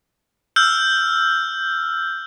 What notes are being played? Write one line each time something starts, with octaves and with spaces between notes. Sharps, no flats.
E6 F6 G6